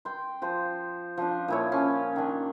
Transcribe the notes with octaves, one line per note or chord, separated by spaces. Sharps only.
G5 C6
F3 C5
F3 D4
A#2 E4 C#5
F3 C#4
D#3 D4